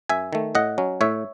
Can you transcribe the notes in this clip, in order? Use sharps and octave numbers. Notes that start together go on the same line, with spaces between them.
F#2 E5 G#5
D#3 A3
A2 D#5 F#5
F#3 C#4
A2 C#5 E5